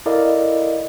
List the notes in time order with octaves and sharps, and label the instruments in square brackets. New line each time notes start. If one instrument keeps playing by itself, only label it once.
[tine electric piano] E4 A4 A#4 D5 D#5 F5